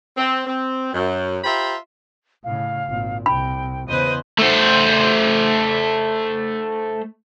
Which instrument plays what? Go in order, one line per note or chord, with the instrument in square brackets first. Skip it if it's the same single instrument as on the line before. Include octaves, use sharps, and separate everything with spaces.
[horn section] C4
C4
F#2
F4 G4 C5 E5 A#5 B5
[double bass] A2 C#3 [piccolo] F5
[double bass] G#1 A#2
[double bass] C2 [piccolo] G5 [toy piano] B5
[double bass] E2 C#3 [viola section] B4 C5 D#5 [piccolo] D#7
[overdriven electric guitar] A3 C5